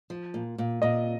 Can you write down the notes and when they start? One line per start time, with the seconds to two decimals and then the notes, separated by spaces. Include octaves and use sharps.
0.10 F3
0.34 A#2
0.58 A#2
0.82 A#2 D#5